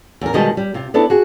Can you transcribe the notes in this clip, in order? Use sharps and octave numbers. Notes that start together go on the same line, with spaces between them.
E2 A#4
B2 D#3 G3 G#3 D#5 A5
G3
C3 F4
B3 C4 D4 E4 A4
F#4 G#4